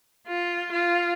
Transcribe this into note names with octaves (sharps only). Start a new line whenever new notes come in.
F4
F4